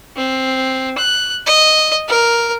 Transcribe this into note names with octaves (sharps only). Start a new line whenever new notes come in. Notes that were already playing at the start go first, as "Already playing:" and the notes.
C4
F#6
D#5
A#4